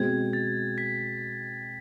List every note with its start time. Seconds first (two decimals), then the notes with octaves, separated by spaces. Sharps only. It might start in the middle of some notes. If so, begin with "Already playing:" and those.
Already playing: B2 G#3 C4 G#6
0.33 A6
0.78 B6